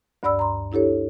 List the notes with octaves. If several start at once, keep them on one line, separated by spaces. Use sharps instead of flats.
D2 G2 D5 B5 E6
A#5 C6
D4 E4 G4 A4 C#5